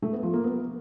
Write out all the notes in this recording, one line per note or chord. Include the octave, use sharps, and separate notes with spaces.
A3
B3
F3
A#3
B3